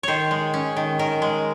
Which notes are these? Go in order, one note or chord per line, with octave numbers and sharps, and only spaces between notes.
D#3 C5 C#5
G#3
C#4
D#3
D#3 A#4
G#3